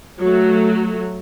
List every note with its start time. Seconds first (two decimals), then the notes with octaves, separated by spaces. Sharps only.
0.20 F#3 A3